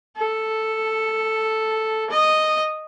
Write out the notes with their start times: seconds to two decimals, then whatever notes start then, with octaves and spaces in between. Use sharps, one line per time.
0.17 A4
2.11 D#5